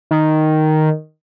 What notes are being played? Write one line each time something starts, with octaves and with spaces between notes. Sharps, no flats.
D#3